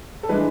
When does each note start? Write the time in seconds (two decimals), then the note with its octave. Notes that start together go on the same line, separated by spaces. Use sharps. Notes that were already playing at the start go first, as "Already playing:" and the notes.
0.23 A4
0.29 E3 G#3 D4 B4